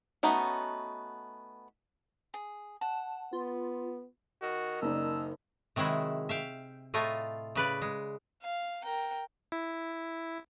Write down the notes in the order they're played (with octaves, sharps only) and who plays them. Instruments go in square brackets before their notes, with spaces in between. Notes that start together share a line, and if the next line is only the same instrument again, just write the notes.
[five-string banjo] A3 B3 C#4 D#4 F#4
[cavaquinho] G#4
[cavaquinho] F#5 [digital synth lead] A5
[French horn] B3 [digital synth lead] F4
[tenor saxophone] D#3 [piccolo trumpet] F#4
[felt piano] F#1 D#4 D5 [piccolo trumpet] E6
[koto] C3 D#3 F#3 G#3 E4
E5 F5 G5
A2 A3 F4 D#5 G#5
C#3 B4 D5
G#3
[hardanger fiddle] F5
A#4 G5
[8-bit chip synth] E4